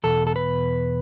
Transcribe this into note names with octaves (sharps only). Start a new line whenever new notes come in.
E2 B2 A4
A4
B4